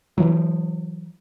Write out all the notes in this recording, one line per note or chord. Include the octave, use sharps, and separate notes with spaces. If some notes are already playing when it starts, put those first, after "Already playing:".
E3 F#3